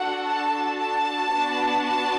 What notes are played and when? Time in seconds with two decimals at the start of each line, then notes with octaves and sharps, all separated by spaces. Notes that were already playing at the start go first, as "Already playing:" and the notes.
Already playing: D4 F#4 A4 F#5
0.27 A5
0.80 A5
1.33 B3 D4 F#4
1.87 A5